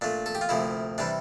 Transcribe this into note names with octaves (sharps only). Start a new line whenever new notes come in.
A#2 A3 D4
A4
G4
F4
D2 C3 F3 A#3 E4
C3 E3 G3 D4